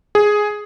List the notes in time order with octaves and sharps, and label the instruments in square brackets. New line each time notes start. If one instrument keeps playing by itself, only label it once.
[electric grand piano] G#4